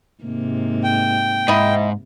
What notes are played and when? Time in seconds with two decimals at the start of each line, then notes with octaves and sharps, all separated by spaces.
0.23 G#2 C3 A#3
0.84 G5
1.48 G#2 E4 D#5